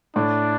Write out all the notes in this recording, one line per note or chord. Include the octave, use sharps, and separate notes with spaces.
A2 D4